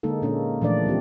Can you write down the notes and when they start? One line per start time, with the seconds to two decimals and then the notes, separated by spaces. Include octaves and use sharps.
0.03 D3 G#3 A#3 D#4 A4
0.22 A#2 A#3 C#4 D4 G#4
0.61 A#2 E3 F3 A3 D4 D5
0.86 E3 G#3 C4 G4